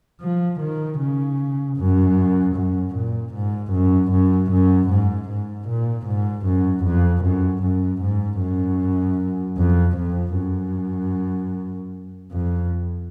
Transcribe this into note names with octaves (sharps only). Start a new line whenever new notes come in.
F3
D#3
C#3
F#2
F#2
A#2
G#2
F#2
F#2
F#2
G#2
G#2
A#2
G#2
F#2
F2
F#2
F#2
G#2
F#2
F2
F2
F#2
F2